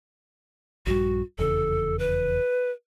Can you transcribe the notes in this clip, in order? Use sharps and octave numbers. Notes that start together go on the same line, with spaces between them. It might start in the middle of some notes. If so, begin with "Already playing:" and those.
A#1 G2 G3 F#4
F1 E2 C#3 A4
B4